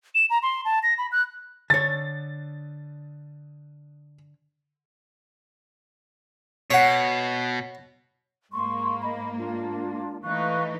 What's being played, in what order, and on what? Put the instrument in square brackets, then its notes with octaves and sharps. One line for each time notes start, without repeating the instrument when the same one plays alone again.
[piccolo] E7
A#5
C6
A5
A#6
B5
F#6
[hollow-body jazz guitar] D3 C#5 [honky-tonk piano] A6
[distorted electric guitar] B2 [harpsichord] C#5 F#5
[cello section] G#2 A#3 [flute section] C6 C#6
[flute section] D#5 B5
D4 F4
[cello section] E3 A3 D#4 [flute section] F5 C#6 F#6